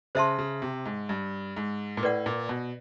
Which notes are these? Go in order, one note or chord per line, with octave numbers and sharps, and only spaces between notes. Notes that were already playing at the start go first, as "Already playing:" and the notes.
C#3 C5 E5 A5 C6
C#3
C3
G#2
G2
G#2
A#2
A2 B4 D5 F#5
A#2
B2